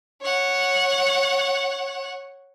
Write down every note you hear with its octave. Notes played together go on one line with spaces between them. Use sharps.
C#5 F#5